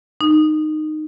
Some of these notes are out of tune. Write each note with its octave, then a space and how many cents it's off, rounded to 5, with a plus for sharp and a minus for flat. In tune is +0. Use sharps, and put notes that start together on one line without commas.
D#4 -15